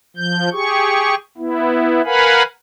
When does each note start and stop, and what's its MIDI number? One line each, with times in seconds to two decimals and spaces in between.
0.17 0.49 53
0.17 0.49 91
0.53 1.15 67
0.53 1.15 68
0.53 1.15 85
1.38 2.02 59
1.38 2.02 64
2.05 2.43 70
2.05 2.43 71
2.05 2.43 77
2.05 2.43 78
2.05 2.43 80
2.05 2.43 83